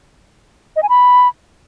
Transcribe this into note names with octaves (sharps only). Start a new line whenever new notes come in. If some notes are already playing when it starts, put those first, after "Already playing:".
D#5
G#5
B5